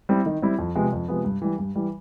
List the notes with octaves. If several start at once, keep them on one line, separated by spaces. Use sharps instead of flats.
G3 C4 E4
D#3
G3 C4 E4
F2
C3 F3 G#3 B3
F2
C3 F3 G#3 B3
G2
E3 G3
G2
E3 G3